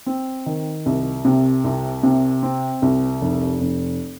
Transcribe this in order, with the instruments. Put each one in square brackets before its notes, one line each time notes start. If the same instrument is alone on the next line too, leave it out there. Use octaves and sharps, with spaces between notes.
[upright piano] C4
D#3
C2
C3
C2
C3
C4
C2
F1
F1